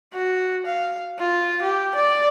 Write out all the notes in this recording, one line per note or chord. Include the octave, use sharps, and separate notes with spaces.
F#4
F5
F4
G4
D5